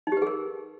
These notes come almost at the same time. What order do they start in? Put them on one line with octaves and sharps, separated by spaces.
D#4 G4 B4 G#4 A#4